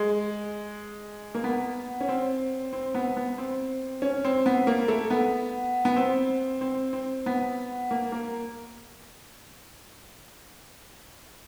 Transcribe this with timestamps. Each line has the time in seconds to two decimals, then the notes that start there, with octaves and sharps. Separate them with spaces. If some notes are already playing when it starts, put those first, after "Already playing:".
Already playing: G#3
1.35 A#3
1.44 B3
2.01 C#4
2.09 C4
2.73 C4
2.95 B3
3.17 B3
3.38 C4
4.02 C#4
4.25 C4
4.46 B3
4.67 A#3
4.88 A3
5.10 B3
5.85 B3
5.96 C4
6.61 C4
6.93 C4
7.26 B3
7.91 A#3
8.12 A#3